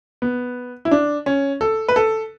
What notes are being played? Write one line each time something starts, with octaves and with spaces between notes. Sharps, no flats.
B3
E4
D4
C#4
A4
B4
A4